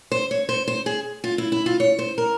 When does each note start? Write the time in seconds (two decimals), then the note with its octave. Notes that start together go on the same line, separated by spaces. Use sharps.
0.12 C5
0.31 C#5
0.49 C5
0.68 C5
0.86 G#4
1.24 F4
1.38 E4
1.52 E4
1.66 F4
1.80 C#5
1.99 C5
2.18 A#4